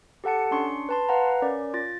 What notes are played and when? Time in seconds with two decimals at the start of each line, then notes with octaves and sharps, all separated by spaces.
0.24 G4 A4 F#5 A5 C#7
0.51 C#4 D4 C6 C#6 C#7
0.89 B4 A5 C6
1.09 B4 F5 F#5 A#5
1.42 C#4 A#4 D5
1.74 F4 A6